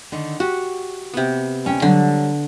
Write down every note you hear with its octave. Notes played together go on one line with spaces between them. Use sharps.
D3 D#3
F#4 G4
C3 B3
D2 C#4 G5
D3 F#3 G3